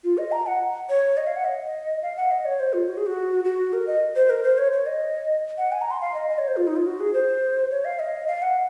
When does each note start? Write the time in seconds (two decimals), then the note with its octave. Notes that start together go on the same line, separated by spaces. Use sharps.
0.04 F4
0.18 D#5
0.32 A#5
0.46 F#5
0.89 C#5
1.17 D#5
1.27 F5
1.36 F#5
1.45 D#5
2.02 F5
2.17 F#5
2.31 D#5
2.45 C#5
2.60 C5
2.73 F4
2.88 F#4
2.97 G#4
3.06 F#4
3.44 F#4
3.73 A#4
3.87 D#5
4.16 C5
4.30 A#4
4.44 C5
4.58 C#5
4.72 C#5
4.86 D#5
5.58 F#5
5.72 G#5
5.82 A#5
5.91 C6
6.01 F5
6.14 D#5
6.29 D#5
6.38 C#5
6.48 C5
6.57 F4
6.67 D#4
6.76 F4
6.86 F#4
7.00 G#4
7.14 C5
7.71 C#5
7.85 F5
7.99 D#5
8.28 F5
8.42 F#5